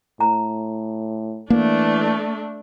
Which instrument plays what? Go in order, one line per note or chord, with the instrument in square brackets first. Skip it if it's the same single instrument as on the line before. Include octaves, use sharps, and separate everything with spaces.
[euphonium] A2 [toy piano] A#5
[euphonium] E3 [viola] A3 D4 [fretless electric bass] A#3